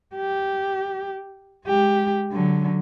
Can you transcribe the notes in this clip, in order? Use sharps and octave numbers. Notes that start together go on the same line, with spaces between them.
G4
G#3 G4
D3 F#3